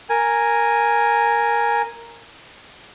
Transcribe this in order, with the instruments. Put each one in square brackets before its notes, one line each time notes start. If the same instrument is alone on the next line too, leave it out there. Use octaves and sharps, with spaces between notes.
[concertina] A#4 G#5